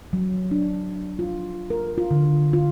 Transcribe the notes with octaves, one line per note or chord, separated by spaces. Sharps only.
F#3
D4
F4
A#4
F4
D3
F4